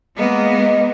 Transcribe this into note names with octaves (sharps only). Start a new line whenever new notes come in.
G#3 A#3 B3 D#5